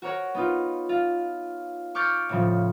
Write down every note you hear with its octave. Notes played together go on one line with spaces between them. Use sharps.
F#4 A#4 C#5 F#5
B3 D#4 F4
F4
C#6 D6 F6 G6 A6 C#7
A2 C#3 F3